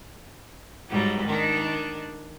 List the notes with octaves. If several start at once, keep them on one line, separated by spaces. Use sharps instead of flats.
G#2 F#3 G3
D#3 D4